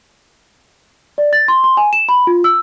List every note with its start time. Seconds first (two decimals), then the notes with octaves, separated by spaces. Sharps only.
1.18 D5
1.33 A6
1.48 C6
1.64 C6
1.77 G#5
1.93 E7
2.09 B5
2.27 F4
2.44 E6